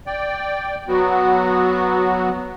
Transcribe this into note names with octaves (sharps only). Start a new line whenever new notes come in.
D5 G5
F#3 B3 F#4